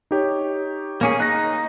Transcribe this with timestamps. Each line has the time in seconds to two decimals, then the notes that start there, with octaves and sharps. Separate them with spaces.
0.11 D#4 G4 C#5
1.01 A#3 C#4 G#4 F5
1.20 D#4 F#6 A#6